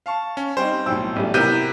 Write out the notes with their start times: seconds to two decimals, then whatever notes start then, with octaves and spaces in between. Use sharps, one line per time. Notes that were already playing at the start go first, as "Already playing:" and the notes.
0.06 F5 A5 C#6
0.37 C#4
0.57 G3 C4 D#4 C5
0.86 B1 A2 G5 E6
1.16 A1 G3
1.34 C3 B3 E4 A#4 G6 D#7